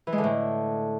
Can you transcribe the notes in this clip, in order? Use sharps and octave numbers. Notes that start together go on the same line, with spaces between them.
E3
G#3
D3
A2